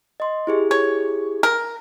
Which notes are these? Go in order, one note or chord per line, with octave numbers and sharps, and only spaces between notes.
D#5 C6
E4 G4 G#4
C#5
A#4